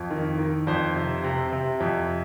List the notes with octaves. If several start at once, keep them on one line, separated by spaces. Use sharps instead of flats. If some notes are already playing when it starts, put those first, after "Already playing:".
Already playing: F2
D#3
D#3
F2 C5
C3
C3
C3
F2